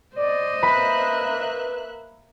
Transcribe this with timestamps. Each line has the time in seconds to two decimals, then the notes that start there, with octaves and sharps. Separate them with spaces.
0.16 C5 D5 D#5
0.63 A#3 B4 E5 B5 F#6